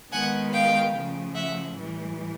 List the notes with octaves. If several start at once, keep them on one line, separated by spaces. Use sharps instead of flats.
D#3 G#3 B3 F#5 G#5
F5 G5
C#3 F3 A3
E5 F#5
A2 E3 G3